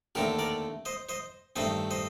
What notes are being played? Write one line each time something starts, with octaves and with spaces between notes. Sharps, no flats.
D#2 D3 A3 C4 G4 A#4
A#4 D5
C5 D#5
C5 D#5
G2 D#3 A3 C4 C5 D#5
C5 D#5